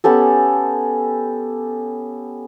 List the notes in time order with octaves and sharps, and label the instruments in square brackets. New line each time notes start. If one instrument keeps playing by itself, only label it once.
[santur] B3 C#4 G4 A4